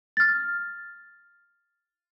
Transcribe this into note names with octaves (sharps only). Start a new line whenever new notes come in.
F6 A6